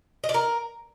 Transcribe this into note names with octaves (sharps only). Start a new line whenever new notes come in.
D#5
D5
A#4